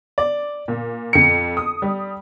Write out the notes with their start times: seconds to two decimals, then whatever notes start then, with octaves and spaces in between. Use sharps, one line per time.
0.18 D5
0.68 A#2
1.13 F2 C#7
1.57 D#6
1.82 G3